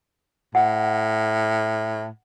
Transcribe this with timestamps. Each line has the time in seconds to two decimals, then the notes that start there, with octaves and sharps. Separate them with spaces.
0.55 A2 F#5